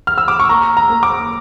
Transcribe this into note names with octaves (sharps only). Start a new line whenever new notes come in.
F6
E6
D6
C#6
A#3 A#5
A#5
A#3
D6